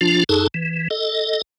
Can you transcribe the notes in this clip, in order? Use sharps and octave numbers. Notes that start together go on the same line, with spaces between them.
F3 D4 F4
F#2 D#4 G#4 A4 A5
E3
A4 D#5